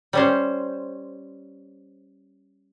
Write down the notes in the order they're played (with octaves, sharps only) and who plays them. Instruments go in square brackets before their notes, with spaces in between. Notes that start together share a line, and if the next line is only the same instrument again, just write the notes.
[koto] G3 C#4 C5